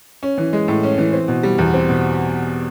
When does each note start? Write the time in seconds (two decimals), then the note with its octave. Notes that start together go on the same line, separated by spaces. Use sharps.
0.23 C#4
0.38 E3
0.53 G#3
0.68 A2
0.83 C#4
0.98 E3
1.13 C4
1.28 B2
1.43 G3
1.58 E2
1.74 C4
1.89 B2